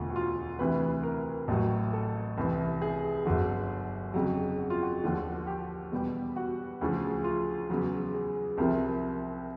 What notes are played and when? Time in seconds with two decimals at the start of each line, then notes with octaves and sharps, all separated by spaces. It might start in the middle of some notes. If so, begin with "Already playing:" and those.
Already playing: E1 D2 D3 F4
0.10 F#4
0.16 F4
0.59 D2 C3 E3 B4
1.03 A#4
1.48 A1 A2 F#3
1.93 A4
2.38 C2 C3 E3
2.82 G#4
3.25 G1 F#2 D3 F#3
4.14 F2 C#3 F#3
4.59 F#4
4.70 F4
4.83 F#4
5.04 D#2 D3 F3
5.47 G4
5.92 E2 B2 G3
6.36 F#4
6.81 D2 C#3 F3
7.24 F4
7.70 E2 C#3 F#3
8.14 G#4
8.58 C2 C3 F3 A#4